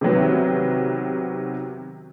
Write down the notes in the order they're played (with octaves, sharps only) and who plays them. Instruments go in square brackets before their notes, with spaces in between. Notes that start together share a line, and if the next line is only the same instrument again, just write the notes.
[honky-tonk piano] C3 D#3 F#3 B3